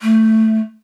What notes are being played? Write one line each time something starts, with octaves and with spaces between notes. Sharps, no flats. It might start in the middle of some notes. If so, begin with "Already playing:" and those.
A3